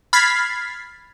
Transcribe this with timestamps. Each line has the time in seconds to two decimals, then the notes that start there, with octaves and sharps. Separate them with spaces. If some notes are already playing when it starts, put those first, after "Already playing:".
0.13 B5 F6 G#6 A6 B6 C7